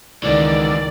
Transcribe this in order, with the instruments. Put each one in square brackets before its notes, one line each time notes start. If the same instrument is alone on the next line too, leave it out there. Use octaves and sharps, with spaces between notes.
[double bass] C#2 D#3 [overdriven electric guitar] G#2 E3 [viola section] D5